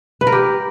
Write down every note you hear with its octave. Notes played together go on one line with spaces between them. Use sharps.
B4
A#4
G4